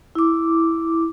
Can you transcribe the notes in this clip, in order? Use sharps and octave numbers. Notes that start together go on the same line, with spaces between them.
E4 D6